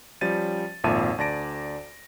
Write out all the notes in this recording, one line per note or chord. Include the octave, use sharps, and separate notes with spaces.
F3 G3 C#4 A6 D#7
G#1 F2 A#2 E5 A5 D#7
D2 D5 A5 A#6 D7